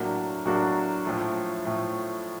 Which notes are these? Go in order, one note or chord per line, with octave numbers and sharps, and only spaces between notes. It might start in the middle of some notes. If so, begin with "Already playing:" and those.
Already playing: A2 F#3 A#3 D4 F#4
A2 F#3 A#3 D4 F#4
A2 F3 A3
A2 F3 A3